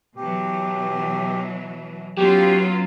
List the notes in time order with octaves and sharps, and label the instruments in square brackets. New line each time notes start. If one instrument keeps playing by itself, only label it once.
[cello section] B2 E3 F#3 [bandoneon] G4
[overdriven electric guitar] F#3 [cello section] B3 C#4 F4 [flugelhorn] G4 [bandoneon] C#6